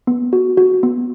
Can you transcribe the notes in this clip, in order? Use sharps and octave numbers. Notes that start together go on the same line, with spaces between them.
B3
F#4
F#4
B3